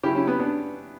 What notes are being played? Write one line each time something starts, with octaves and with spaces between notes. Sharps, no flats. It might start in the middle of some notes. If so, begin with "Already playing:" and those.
C#3 F#3 E4 G4
C#4 E4
B3
B3 D4